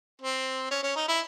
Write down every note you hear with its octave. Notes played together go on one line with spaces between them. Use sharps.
C4
C#4
C#4
D#4
E4